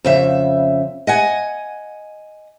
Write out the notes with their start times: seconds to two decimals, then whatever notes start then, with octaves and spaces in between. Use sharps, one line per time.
0.04 F2 C#3 E5
1.07 D#5 F#5 G#5